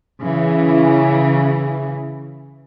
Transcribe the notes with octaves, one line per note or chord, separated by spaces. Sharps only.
C#3 E3